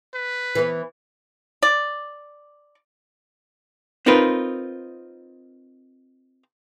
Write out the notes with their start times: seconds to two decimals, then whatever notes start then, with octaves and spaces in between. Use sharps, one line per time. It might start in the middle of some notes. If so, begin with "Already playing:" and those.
0.14 B4
0.55 E3 B3
1.63 D5
4.06 C4 D#4 F4 A#4 B4